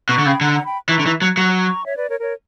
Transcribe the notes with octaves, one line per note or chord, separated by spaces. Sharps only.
B2 A#5 C#6
D3
C#3 G5 B5
D3 F#5 A#5
F#5 A#5
G5 B5
E3 A#5 C#6
D3
E3
F#3
F#3 A#5 C#6
C#5 E5
B4 D5
A#4 C#5
A#4 C#5